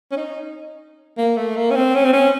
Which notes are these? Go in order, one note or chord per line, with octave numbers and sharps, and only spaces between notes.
C#4
D#4
A#3
A3
A#3
C#4
C4
C#4
C4
C#4